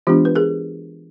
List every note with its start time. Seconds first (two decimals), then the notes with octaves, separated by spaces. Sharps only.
0.07 E3 G#3 B3 D4 F4 G4
0.25 B4
0.35 G#4 A#4